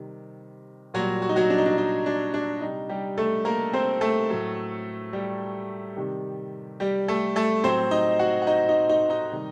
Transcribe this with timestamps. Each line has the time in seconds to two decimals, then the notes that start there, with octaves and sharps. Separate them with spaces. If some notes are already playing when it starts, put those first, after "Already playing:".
Already playing: C3 D#3 G3
0.94 A#2 F#3 G3 F#4
1.22 F#4
1.29 D#4
1.36 F#3 F#4
1.50 D4
1.58 D#4
1.66 D4
1.78 D#4
2.06 D4
2.34 D4
2.61 C3 G3 D#4
2.89 G3 G4
3.17 A3 A4
3.45 A#3 A#4
3.73 C4 C5
4.01 A3 A4
4.30 A2 F#3
5.13 G3 G4
5.97 C3 D#3 G3
6.80 G3 G4
7.08 A3 A4
7.36 A3 A4
7.64 A2 F#3 C4 C5
7.91 D#4 D#5
8.19 F#4 F#5
8.42 F#5
8.47 D#4 D#5
8.69 D#4 D#5
8.89 D#4 D#5
9.10 D#4 D#5
9.32 C3 D#3 G3